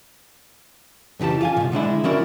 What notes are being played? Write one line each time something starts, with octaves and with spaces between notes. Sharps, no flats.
F2 C#3 E3 G4 A5
F4 F5 G#5
C2 A#2
D3 G#3 D4 E4
F3 C#4 E4 F#4 A#4 D5